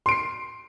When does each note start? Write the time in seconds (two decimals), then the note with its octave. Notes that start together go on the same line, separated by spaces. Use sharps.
0.06 C6
0.09 D7
0.11 C7